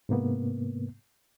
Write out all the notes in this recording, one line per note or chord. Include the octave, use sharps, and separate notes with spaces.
G#2 C3 A#3 B3